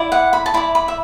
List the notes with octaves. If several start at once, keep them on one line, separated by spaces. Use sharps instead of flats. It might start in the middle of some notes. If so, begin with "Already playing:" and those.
Already playing: E4 D5
F#5
B5
A5
E4 D5 B5
B5
E5